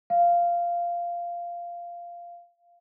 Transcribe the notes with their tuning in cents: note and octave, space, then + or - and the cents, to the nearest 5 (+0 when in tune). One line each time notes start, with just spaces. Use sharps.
F5 -10